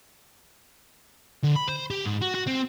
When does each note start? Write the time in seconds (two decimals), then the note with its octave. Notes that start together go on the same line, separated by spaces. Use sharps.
1.43 D3
1.55 B5
1.68 C5
1.90 G4
2.05 G#2
2.21 F#4
2.34 F#4
2.47 C4